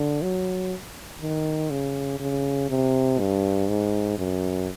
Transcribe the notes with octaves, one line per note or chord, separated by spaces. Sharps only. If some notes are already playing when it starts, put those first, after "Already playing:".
Already playing: D3
F#3
D#3
C#3
C#3
C3
G2
G#2
F#2